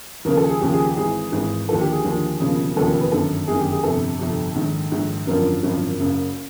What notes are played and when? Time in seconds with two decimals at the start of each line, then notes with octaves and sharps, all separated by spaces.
0.25 D#2 C#3 F3 A#4
0.37 A4
0.49 G#4
0.61 D#2 C#3 F3 G4
0.73 G#4
0.85 G4
0.97 G#1 G#2 E3 G#4
1.32 G#1 G#2 E3
1.69 D#2 D3 F3 A4
1.81 G4
1.92 G#4
2.04 D#2 D3 F3
2.40 E1 D#2 C#3 F3
2.76 E1 D#2 C#3 F3 A4
2.88 A#4
3.01 B4
3.12 G1 F#2 D#3 A4
3.48 G1 F#2 D#3 G#4
3.60 G4
3.72 G#4
3.84 G1 F2 C3 A4
4.19 G1 F2 C3
4.55 A#1 G#2 D#3
4.92 A#1 G#2 D#3
5.27 G#1 F#2 D3 F3 A#4
5.63 G#1 F#2 D3 F3
5.99 F#1 F#2 C#3